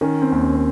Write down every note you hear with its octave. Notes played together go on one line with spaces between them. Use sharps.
D#3 C#4
C4
D#2
C#4
C4